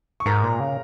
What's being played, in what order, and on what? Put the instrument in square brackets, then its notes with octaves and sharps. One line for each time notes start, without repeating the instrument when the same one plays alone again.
[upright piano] C#6
[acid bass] G#2 [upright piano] A#4 A#5
[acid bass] A#2
C#3